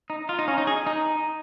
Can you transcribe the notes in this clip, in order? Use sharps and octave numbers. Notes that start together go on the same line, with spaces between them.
D#4
F4
D#4
C#4
D#4
G#4
D#4